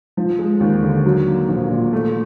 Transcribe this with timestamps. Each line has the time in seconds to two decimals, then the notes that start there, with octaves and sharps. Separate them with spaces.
0.17 F3
0.39 G#3
0.60 D#2
0.83 D3
1.05 F#3
1.27 A#3
1.49 A#1
1.70 A#2
1.93 A3